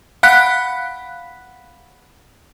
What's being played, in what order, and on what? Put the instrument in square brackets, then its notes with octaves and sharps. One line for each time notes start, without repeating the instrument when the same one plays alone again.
[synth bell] F5 F#5 B5 F#6 B6